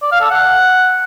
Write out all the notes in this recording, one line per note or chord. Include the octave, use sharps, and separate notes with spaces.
D5
F5
A4
F#5